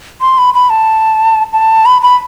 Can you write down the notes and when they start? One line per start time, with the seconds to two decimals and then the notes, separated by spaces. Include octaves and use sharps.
0.21 C6
0.38 B5
0.54 B5
0.70 A5
1.53 A5
1.86 B5
2.02 B5